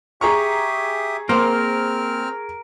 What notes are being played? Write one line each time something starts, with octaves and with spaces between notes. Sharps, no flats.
G4 G#4 E5 A#5 C#6 D#6
A#3 C4 A#4 C5 F6